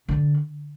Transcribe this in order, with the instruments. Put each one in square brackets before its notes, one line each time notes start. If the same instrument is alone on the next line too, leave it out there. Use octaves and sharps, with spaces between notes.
[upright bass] D3